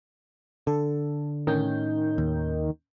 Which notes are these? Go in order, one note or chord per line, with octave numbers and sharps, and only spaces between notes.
D3 A4
A2 D#3 C#4 G6
D#2